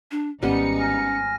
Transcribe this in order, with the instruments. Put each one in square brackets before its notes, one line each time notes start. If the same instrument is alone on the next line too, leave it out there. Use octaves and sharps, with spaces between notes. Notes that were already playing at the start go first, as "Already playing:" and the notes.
[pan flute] D4
[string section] G#1 D#4 C#7 [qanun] G3 B3 [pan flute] C#4
[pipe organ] G#5 F6 A#6